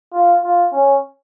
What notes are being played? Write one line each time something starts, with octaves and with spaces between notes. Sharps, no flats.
F4
F4
C#4